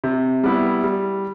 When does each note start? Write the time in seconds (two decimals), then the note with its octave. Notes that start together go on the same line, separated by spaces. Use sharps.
0.04 C3
0.44 G3 B3 E4
0.84 G3